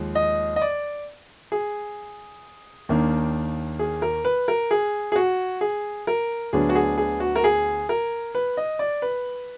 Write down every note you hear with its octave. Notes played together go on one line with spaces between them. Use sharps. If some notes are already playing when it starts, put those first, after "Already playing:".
Already playing: D#2 F3 G#3
D#5
D#5
D5
G#4
D#2 D#3 A#3 D4
G#4
A#4
B4
A#4
G#4
G#4
F#4
G#4
A#4
D2 D3 F#3 B3 D4 G#4
F#4
G#4
G#4
F#4
A#4
G#4
A#4
B4
D#5
D5
B4